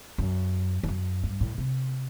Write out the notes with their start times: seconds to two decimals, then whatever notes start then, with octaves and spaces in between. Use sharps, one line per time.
0.18 F#2
0.83 E2
0.88 F#2
1.23 G2
1.41 A2
1.58 C3